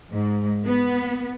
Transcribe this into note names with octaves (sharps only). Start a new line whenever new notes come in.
G#2
B3